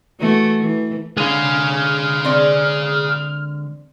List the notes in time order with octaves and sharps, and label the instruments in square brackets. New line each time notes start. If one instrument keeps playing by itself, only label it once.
[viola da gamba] E3 A3 F#4
E3
[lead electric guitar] D3 G#3 [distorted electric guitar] G#4 F5 [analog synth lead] F6
[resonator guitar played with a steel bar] C4 D5